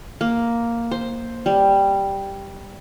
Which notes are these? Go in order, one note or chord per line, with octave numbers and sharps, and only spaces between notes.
A#3
C5
G3